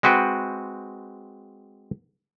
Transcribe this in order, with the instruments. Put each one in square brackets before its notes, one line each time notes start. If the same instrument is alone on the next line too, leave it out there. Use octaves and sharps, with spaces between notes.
[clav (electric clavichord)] G#3 C4 F#4 B4 G5